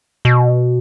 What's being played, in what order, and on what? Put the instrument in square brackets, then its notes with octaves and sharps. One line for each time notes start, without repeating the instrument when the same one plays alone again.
[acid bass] B2